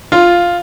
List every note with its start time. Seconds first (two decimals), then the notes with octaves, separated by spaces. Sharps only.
0.12 F4